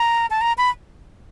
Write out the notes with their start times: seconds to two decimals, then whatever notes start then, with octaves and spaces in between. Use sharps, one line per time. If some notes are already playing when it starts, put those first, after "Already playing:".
Already playing: A#5
0.30 A5
0.41 A#5
0.58 B5